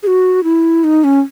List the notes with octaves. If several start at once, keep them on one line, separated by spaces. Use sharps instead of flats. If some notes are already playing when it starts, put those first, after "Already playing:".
G#4
F#4
E4
D#4
C#4